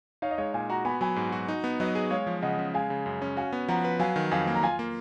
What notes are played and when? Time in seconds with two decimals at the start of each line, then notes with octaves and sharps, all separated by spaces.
0.22 D#4 C#5 F5
0.31 D#5
0.38 G#3 C#5 F5
0.53 A#2 F5 G#5
0.69 F#4 F#5 A#5
0.85 B3 G#5 B5
1.01 F#3 G#5 B5
1.16 G#2
1.32 F#4
1.48 D#4
1.64 B3
1.80 F#3 B4 D#5
1.95 G#4
2.11 G#3 C#5 F5
2.27 F3
2.42 C#3 D#5 F#5
2.59 C#3
2.74 G#3 F5 G#5
2.90 C#3
3.06 F#2
3.22 C#4
3.37 F#4 F5 G#5
3.53 B3
3.68 F3 F#5 A#5
3.84 B4
4.00 F#3 F5 G#5
4.16 D#3
4.31 F2 F5 G#5
4.47 A#3
4.55 A#5
4.63 F4 F5 G#5
4.79 A#3